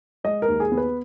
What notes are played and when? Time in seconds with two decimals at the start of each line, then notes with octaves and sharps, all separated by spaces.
0.24 G#3 D#5
0.42 A#4
0.48 D#2
0.60 G#4
0.72 B3
0.77 B4